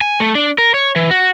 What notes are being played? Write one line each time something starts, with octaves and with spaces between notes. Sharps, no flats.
G#5
A3
D4
A#4
C#5
E3
F#4